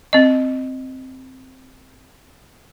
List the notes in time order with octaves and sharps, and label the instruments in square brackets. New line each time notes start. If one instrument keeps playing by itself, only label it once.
[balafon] C4 D#5